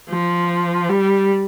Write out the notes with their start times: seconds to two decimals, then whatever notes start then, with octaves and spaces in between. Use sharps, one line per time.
0.10 F3
0.90 G3